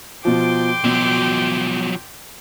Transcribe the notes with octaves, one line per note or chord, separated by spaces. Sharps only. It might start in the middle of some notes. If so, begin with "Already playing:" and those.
B2 F3 G5 C6 D6
B2 F3 F#3